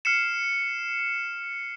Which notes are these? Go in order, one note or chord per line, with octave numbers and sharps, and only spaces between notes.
F6 C7 C#7 E7